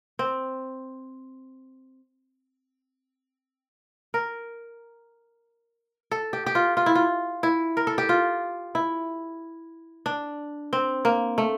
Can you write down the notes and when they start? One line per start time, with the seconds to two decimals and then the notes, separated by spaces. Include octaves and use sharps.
0.19 C4
4.14 A#4
6.11 A4
6.33 G4
6.46 G4
6.55 F4
6.77 F4
6.86 E4
6.95 F4
7.43 E4
7.77 A#4
7.87 A4
7.98 G4
8.09 F4
8.75 E4
10.06 D4
10.73 C4
11.05 A#3
11.38 A3